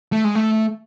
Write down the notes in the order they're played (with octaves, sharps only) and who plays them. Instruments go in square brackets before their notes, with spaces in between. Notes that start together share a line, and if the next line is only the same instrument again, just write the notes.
[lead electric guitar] A3
G#3
A3